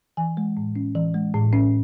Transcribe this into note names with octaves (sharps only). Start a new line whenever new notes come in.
E3 G#5
G#3
A2
C#4
E3
G#3
A2
C#4